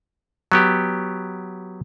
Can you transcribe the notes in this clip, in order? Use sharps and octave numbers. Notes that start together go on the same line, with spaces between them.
F#3 B3 G4